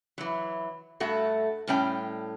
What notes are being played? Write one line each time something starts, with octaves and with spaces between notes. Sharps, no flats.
E3 F#3
G2 A3 F#4
A2 G3 C#4 G5